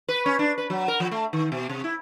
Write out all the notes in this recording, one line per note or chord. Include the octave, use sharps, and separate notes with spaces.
B4
C#4
D4
B4
F#3
A#4
F3
A3
D#3
B2
C3
E4